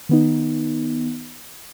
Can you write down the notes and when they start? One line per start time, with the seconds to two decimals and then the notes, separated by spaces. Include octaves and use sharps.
0.09 D#3 B3 D#4